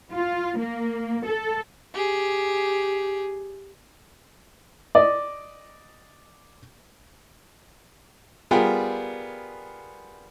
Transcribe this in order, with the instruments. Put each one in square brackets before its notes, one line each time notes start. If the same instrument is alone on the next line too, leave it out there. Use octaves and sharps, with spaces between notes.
[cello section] F4
A#3
A4
[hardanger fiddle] G4 G#4
[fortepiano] D5 D#5
G3 B3 F4 G#4 A#4 G5